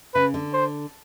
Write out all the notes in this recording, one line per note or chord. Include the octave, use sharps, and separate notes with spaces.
C#3 B4
D3
C5